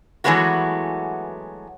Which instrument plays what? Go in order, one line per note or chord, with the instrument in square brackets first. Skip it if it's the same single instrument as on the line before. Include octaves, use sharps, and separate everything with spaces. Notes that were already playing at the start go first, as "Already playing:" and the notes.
[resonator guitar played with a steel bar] E3 F#3 G#3 A3 B3 F#4